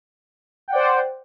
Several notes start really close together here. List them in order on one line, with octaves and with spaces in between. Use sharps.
G5 F#5 D5 C5